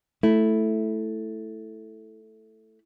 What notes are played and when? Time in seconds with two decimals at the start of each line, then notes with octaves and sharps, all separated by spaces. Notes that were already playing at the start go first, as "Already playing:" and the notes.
0.23 A3 E4